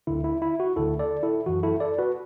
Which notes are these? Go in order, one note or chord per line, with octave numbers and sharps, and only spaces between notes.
D2 D3 E4
E4
E4
F#4
D2 D3 E4 A4
A4 D5
E4 A4
F#2 E3 F#4
E4 A4
A4 D5
F#4 B4